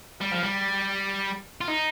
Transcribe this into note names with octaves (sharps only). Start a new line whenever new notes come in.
G3
F3
G3
F4
D#4